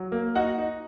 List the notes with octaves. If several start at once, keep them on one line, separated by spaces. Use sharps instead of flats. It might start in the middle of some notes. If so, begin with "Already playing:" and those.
Already playing: F#3
A#3
D#4 F#4 F#5
D#4